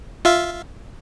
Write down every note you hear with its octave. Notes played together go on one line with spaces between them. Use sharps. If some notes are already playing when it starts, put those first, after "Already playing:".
F4 E5 F5